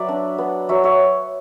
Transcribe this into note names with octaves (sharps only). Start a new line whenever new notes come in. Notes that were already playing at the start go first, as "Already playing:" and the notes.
Already playing: F#3 B4 D5 E5 F#5
D4
B3
F#3 C#5 E5
C#5 E5